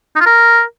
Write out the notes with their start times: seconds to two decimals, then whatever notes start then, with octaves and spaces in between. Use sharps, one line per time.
0.15 D#4
0.21 F4
0.26 A#4